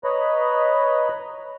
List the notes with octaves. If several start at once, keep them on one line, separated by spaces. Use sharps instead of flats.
B4 C#5 D#5 A#5 B5